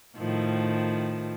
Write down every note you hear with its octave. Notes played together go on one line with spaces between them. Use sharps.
A2 D#3 F3